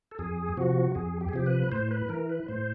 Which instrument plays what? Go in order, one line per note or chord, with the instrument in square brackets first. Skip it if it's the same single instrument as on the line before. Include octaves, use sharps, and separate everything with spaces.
[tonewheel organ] A4
F2 G#4
C3 F3 F#4
F2 G#4
G4
G#4
C3 F3 G4
B4
A2 C5
B4
E3 A#4
B4
A2 C5